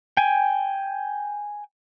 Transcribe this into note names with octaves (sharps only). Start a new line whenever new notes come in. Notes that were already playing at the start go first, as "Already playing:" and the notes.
G5 G#5